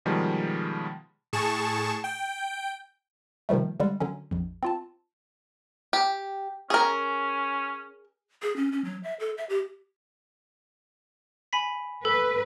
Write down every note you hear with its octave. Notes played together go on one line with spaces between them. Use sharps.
B2 D#3 F3 G3 G#3
A2 G#4 A5 C#6 E7
G5
C3 D#3 F3 G3 A3
D3 G3 G#3
D3 F#3 C#4
A#1 F2
C4 F4 A5
G4
C#4 G#4 A#4
G#4
C#4
C#4
F#3
E5
A4
E5
G4
G#5 B5 B6
A4 B4